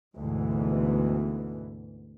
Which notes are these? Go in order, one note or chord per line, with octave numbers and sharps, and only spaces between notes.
D2 G#2 B2 E3